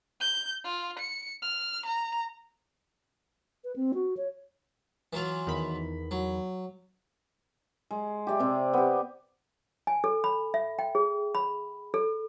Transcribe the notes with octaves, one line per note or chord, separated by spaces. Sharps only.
G6
F4
C#7
F6
A#5
B4
C4
F#4
C#5
E3 F#3 F4
E2 D#3 B5
F#3
G#3
G4 D5 E5
C3 C4
B3 G4
G#5
A4
B5
E5
G5
G#4
B5
A4